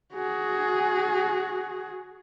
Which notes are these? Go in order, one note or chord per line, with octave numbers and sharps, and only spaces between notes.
F#4 G#4